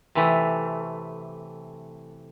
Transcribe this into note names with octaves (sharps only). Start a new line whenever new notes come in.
C3 E3 A3